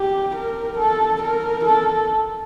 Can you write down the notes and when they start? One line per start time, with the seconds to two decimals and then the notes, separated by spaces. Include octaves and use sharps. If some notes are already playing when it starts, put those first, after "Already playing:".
Already playing: G4
0.35 A#4
0.78 A4
1.23 A#4
1.65 A4